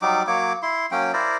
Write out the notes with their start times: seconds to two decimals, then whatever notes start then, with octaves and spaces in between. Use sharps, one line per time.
0.02 F#3 G3 D#4 D6
0.27 F#3 A#3 C#5 D6
0.63 E4 C6
0.91 F#3 A#3 C#4 G5
1.13 E4 A#4 C5 D5